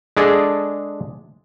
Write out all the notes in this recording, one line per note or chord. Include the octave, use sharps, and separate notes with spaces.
G#3 D4 G#4 A4